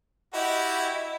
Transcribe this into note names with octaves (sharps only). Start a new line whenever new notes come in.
E4 F#4 G4 D#5